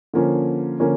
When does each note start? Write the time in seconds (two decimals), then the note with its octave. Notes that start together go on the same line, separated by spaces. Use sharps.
0.14 D3 F3 A#3 C#4
0.80 D3 F3 A#3 C#4